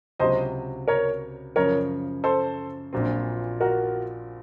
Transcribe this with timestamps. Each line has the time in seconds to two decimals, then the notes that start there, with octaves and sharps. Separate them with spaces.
0.20 C#2 C3 F#3 C5 D#5
0.88 A#4 C#5
1.56 F#2 C#3 F3 A#4 C#5
2.24 A4 C5
2.93 A#1 A#2 F#3 C4
3.61 F#4 A#4